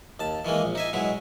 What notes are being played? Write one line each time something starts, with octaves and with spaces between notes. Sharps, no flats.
D#2 A5
D#3 E3 G#3 A#3
A#1
D#4 E5 G#5
B2 F#3 G#3 E4